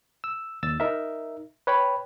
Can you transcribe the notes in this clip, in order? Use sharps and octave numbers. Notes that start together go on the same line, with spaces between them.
E6
D#2 E6 A6
D#4 A#4 E5
B4 C#5 G5 B5